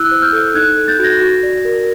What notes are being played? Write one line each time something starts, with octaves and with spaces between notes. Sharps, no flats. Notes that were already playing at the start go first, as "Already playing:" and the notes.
Already playing: E4 E6 F#6
C5
F6 G6
A4
D#4 F#6 G#6
A4
G6 A6
F#4
G#6 A#6
F#4
D5
A#4